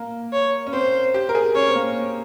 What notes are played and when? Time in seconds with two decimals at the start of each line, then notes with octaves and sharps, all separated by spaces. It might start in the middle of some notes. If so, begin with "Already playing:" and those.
Already playing: A#3
0.33 C#5
0.67 C#4
0.73 C4 C5
1.14 G4
1.29 A#4
1.35 G#4
1.55 C#4 C#5
1.67 C4
1.75 A#3